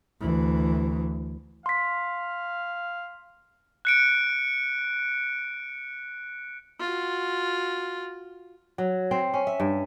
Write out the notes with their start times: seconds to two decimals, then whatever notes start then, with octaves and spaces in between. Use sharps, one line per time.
0.20 D2 E3
1.66 F5 C6 B6
3.85 F#6 C#7 D7
6.80 F4 F#4
8.78 F#3
9.11 C4
9.34 C#4
9.47 E5
9.60 G2